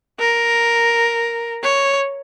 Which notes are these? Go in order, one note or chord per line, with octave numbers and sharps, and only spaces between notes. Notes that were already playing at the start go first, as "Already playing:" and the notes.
A#4
C#5